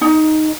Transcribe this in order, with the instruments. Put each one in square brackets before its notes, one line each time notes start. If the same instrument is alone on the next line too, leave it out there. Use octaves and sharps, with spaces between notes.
[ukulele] D#4